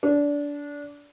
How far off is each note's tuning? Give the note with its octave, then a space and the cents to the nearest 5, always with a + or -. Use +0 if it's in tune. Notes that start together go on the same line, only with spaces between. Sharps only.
D4 -20